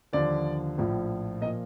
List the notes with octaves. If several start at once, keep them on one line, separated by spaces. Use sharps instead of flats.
D#2 D3 F3 D5
A#1 A2 F3
A#2 F3 D#5